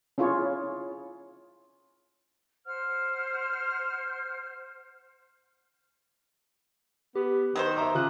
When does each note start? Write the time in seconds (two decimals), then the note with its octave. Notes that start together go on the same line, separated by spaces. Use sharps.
0.18 C#4 E4 F4 G#4 C#5
2.65 C5 F#5 F6
7.15 B3 G4
7.56 D#3 F#3 B4 C5 D#6
7.77 E5 A#5 D6 D#6
7.95 C#3 F4 F#6